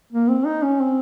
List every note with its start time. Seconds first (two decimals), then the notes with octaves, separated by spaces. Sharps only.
0.12 A#3
0.29 C4
0.45 D#4
0.63 C#4
0.80 C4